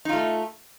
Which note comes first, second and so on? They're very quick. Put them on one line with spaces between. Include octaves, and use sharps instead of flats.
D#4 F4 A3